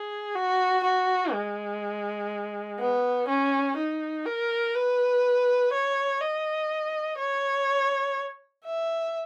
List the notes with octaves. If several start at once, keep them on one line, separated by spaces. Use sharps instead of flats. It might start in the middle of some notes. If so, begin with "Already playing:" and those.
Already playing: G#4
F#4
F#4
G#3
B3
C#4
D#4
A#4
B4
C#5
D#5
C#5
E5